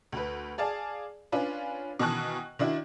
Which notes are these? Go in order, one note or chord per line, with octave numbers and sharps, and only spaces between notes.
D2 B4
G#4 D5 F5 A5
C#4 D4 F4 B4
B2 D#3 E3 A5 C#6 F#6
D#3 D4 E4 F#4